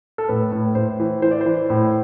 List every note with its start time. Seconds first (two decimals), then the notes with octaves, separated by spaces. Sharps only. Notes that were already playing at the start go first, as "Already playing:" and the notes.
0.18 A4
0.28 A2 B4
0.52 A2
0.75 A2 C5
1.00 E3
1.22 E3 C5
1.31 D5
1.41 E3 C5
1.69 A2 C5